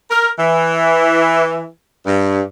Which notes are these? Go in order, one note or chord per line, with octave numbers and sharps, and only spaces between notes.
A#4
E3
G2